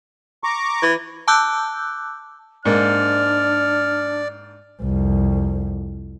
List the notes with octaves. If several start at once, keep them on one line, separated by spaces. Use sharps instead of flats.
A#5 C#6 D6
E3
A5 D6 E6 F#6 G6
G#2 A#3 D4 D5 F6
C2 F2